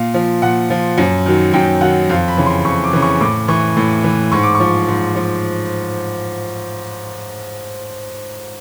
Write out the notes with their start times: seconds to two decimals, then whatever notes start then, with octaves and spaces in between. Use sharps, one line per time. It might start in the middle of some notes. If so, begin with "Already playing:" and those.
Already playing: A#2 F5
0.14 F3
0.42 A#2 F#5
0.70 F3
0.98 F#2
1.26 D#3 F#3
1.53 F#2 G5
1.81 D#3 F#3 F#5
2.09 F2 F5
2.28 B5
2.37 C#3 E3
2.46 C6
2.65 F2 C#6
2.84 D6
2.93 C#3 E3
3.02 C#6
3.21 A2 D6
3.48 E3 C#6
3.77 A2
4.04 E3
4.32 G#2 C#6
4.43 D6
4.55 C#6
4.60 F3
4.88 G#2
5.16 F3